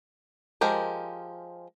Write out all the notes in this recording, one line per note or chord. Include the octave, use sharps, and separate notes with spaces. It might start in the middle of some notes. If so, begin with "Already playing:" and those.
F3 G#3 G4 A#4